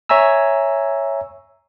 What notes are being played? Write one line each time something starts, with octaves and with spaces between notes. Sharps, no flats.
C#5 E5 G#5 A#5 E6